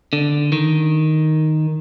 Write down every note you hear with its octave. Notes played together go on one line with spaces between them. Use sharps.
D3
D#3